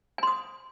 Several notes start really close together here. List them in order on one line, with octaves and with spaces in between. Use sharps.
G#5 C6 D#6